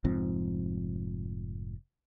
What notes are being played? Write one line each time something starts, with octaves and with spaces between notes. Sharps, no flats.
F1 G#2 F3 C4